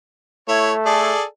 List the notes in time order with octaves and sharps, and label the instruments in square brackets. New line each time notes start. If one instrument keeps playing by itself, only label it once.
[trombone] A3 [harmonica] E4 C#5
[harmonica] G#4 A4 D5